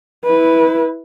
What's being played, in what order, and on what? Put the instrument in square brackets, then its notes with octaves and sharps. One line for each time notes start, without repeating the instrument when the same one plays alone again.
[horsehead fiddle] E4 B4